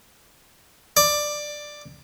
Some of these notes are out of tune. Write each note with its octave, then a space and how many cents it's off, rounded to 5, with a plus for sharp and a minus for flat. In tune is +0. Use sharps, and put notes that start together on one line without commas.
D5 +10